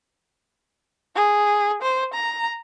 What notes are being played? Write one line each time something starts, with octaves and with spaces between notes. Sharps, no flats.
G#4
C5
A#5